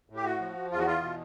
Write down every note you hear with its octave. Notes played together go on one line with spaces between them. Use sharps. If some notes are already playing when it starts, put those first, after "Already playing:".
A2
G4
F#4
F3
E2 F4
F#4
F4
B2